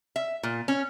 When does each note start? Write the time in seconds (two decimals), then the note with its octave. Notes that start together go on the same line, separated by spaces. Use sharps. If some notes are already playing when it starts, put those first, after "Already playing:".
0.16 E5
0.43 A#2
0.68 C#4